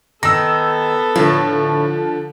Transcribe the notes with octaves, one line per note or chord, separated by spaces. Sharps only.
D#3 B3 A4 E6 A#6
A2 D3 F3